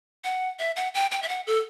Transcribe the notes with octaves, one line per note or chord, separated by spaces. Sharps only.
F#5
E5
F#5
G5
G5
E5
F#5
A4